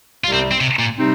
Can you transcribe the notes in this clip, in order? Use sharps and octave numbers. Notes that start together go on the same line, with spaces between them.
C2 C3 G3 F4
C4
C4
C3
A#2
C3 G3 C4 D#4